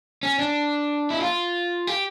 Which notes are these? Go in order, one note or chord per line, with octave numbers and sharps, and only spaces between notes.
C#4
D4
E4
F4
G4